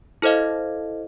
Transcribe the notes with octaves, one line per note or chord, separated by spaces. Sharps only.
E4 A4 C5 D#5 F5